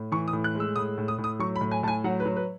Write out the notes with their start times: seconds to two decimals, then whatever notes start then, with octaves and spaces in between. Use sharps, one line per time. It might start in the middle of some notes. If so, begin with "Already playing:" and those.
Already playing: A2
0.12 E3 C#6
0.28 D#6
0.33 A2
0.44 F#6
0.55 G#3
0.60 E6
0.76 A2 D#6
0.98 A2
1.08 D#6
1.18 A2
1.24 D#6
1.39 F#3 C#6
1.56 B5
1.61 A2
1.71 G#5
1.83 A2 A5
1.88 G#5
2.04 F#3 F#5
2.20 B4
2.26 F#3
2.36 B4